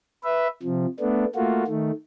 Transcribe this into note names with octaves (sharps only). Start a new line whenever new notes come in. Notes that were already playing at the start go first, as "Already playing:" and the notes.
B4 E5
C3 F3
A3 B3 D4
A3 A#3 F4 F#4
D#3 A3